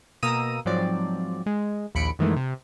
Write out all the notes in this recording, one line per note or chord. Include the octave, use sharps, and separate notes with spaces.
B2 A#3 A#5 D#6 E6 D#7
G#2 F3 F#3 C4 D5
G#3
A#1 D#2 B5 C#7 D7
F#2 D#3 E3 G#3 A3
C3